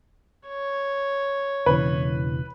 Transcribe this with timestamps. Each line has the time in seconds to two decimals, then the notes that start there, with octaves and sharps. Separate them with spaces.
0.47 C#5
1.66 E1 C#3 E3 B4